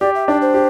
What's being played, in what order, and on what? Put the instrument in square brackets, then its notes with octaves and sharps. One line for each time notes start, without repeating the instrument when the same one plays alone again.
[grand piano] G4 [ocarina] D5
[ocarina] E5
[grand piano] D4 [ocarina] D5
[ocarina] C5
[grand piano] G4